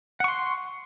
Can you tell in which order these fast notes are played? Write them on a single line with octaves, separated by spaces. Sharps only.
F#5 C#6 C6